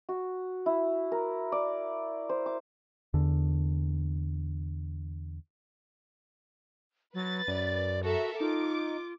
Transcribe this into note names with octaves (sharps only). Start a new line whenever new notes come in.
F#4
E4
A#4
D5
C5
D6
E2 D3
F#3 B4 A6
F#2 D5
F#4 A4 A#4 E5
D#4 F4 D6